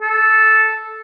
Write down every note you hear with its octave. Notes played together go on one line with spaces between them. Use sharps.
A4